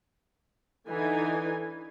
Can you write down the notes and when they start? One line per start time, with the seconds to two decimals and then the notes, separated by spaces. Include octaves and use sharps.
0.87 D3 E3 D#4 G#5